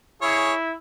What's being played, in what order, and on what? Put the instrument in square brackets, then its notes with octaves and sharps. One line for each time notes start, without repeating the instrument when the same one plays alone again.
[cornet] E4 [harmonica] G#4 C#5